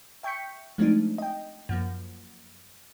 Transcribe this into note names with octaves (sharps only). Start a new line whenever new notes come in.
E5 G5 C#6 G6 B6 C#7
F3 G#3 A3 C4 D4 D#4
D#5 G5
F#2 F3 A#3